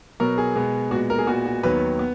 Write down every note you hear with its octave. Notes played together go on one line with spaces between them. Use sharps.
B2 F#3 B3 A#4
G#4
B2 G#3 B3
A#2 G#3 B3 F#4
A#4
G#4
A#2 G#3 B3 F#4
F#4
D#2 D#3 F#3 B3 B4
B3